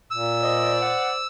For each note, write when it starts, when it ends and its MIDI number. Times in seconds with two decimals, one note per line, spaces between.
0.11 0.96 46
0.11 1.27 88
0.43 1.27 72
0.43 1.27 74
0.43 0.73 75
0.81 1.11 78